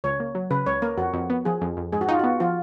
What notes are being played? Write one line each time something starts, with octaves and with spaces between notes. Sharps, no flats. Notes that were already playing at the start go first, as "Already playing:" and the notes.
C#2 C#5
A#3
F#3
C#3 B4
C#2 C#5
A#3 A#4
F2 F#4
F2
B3
F3 G#4
F2
F2
G#2 G#4
F#4
D#4 F4
B3 F#4
F3 F4